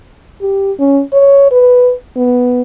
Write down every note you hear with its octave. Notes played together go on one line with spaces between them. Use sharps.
G4
C#4
C#5
B4
B3